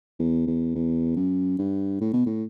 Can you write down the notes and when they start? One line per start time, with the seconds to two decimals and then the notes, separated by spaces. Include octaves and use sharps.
0.19 E2
0.47 E2
0.75 E2
1.16 F#2
1.59 G2
2.01 A2
2.13 B2
2.26 A2